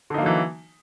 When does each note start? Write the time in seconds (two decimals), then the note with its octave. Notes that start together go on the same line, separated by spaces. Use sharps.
0.10 D3
0.14 D#4
0.18 A#3
0.22 F#3
0.26 E3